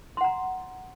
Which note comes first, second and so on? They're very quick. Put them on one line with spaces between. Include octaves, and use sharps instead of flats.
C6 F#5 A#5